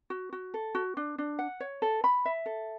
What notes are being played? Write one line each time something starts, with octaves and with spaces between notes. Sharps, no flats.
F#4
F#4
A4
F#4
D4
D4
F#5
C#5
A4
B5
E5
A4